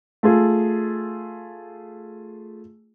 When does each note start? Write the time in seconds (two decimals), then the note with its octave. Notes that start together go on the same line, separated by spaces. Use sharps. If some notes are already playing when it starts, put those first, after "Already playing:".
0.23 A3 F4 G#4